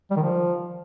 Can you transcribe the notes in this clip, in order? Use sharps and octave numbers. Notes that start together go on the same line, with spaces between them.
G3
D#3
F3